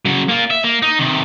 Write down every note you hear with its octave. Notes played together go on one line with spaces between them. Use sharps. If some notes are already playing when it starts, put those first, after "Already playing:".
C#3 F#3
A#3 F4
E5
A#3
D#4
C3 D#3